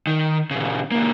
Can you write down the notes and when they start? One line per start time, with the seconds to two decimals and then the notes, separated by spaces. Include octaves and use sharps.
0.07 D#3
0.51 A#2 C#3
0.91 C#2 A#3